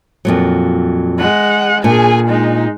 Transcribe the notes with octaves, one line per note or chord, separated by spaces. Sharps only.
F2 A#2 F#3
G#3 F#5
A#2 D4 G#4 G#5
G#3 D#4